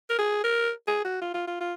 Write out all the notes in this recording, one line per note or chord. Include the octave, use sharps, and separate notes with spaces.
A#4
G#4
A#4
G#4
F#4
F4
F4
F4
F4